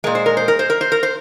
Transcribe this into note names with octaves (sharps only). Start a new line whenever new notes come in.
A#2 G#3 A#4
C5
A#4
C5
A#4
C5
A#4
C5
A#4
C5